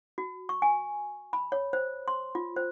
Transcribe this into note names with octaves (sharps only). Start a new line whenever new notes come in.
F#4
C#6
G#5
B5
C#5
C5
C6
F4
C5